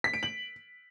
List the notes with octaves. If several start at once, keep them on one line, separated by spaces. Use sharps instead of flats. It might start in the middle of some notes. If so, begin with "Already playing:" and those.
B6
D7
F#7